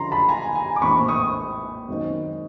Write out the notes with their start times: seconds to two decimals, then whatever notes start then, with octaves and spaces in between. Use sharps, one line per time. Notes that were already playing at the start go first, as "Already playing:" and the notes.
Already playing: F#2 D3 F3 A#5 C6
0.11 A5 B5
0.29 G#5 A#5
0.55 G#5 A#5
0.76 D6
0.82 A#1 A2 E3 G#3 C4 B5 C#6
1.08 C#6 D#6
1.88 F#2 D#3 G#3 C4 D#4